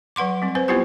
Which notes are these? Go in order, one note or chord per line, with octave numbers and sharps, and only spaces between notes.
F#3 B4 F#5 C6 D6
G3 C4
C4 B4 C5
B3 C4 E4 F4 G4 C5